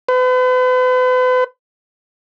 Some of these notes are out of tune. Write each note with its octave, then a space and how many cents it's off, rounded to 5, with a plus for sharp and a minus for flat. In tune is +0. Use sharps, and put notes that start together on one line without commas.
B4 +40